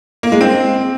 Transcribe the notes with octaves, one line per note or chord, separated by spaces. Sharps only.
A#3
G#3
C4